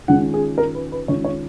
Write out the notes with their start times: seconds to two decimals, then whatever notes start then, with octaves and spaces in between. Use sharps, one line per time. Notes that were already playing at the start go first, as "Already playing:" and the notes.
0.08 D#3 G#3 C#4 F4 F#5
0.34 G#4
0.58 A#4
0.75 B4
0.92 B4
1.08 D#3 G#3 C#4 F4 C#5
1.25 C#5